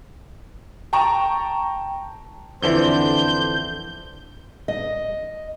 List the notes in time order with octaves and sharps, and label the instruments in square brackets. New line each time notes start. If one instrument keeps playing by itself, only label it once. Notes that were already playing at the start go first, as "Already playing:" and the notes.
[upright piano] G5 A5 A#5 C#6
[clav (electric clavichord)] F2 D3 E3 [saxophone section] D4 C5 [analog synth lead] G6
[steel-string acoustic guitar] D#5